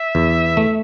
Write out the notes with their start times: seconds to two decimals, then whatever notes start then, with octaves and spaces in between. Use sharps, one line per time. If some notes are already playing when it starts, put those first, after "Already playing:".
Already playing: E5
0.15 E2
0.57 A3